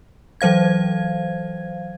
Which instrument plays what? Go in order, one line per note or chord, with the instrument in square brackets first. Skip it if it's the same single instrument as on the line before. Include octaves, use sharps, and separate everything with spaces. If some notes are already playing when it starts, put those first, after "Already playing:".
[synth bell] E3 F#3 C5 F5 G#6